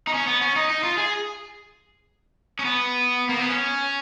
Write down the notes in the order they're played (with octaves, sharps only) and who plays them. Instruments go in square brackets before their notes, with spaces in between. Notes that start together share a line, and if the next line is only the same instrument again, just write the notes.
[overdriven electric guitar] D#4
C#4
B3
C#4
D#4
D#4
F4
G#4
C#4
B3
A#3
B3
C#4